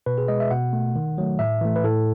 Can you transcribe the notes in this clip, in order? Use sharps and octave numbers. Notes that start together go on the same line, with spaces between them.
B2 B4
G#4
G#3 D#5
E5
B2 F#5
A3
D#3
F#3 A3
A2 E5
E3 A3
B4
A2 A4